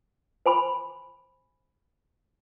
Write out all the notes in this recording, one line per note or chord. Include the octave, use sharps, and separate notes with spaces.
C5 G#5 B5 C6